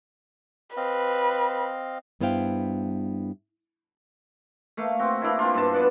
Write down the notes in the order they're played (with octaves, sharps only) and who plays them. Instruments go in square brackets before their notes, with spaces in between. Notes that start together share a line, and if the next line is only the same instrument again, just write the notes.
[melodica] C4 D#5 F5 [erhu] B4
[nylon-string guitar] G2 B3 E4 C5 F5 G5
[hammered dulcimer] A3 A#3 F5
C4 F#4
A#3 D4 E4
C4 F4
G2 B2 A5
B3 D5 F#5